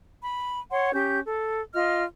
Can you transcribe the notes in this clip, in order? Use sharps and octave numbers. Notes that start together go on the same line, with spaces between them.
B5
C#5 F#5 C6
C#4 G4 G6
A4
F4 D#5 F6